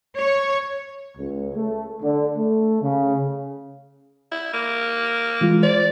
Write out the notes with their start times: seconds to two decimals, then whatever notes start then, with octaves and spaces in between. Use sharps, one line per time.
0.17 C#5
1.17 C#2
1.56 A3
2.02 D3
2.36 A3
2.83 C#3
4.32 E4
4.54 A#3
5.41 E3 G#3 F4
5.63 C5 D5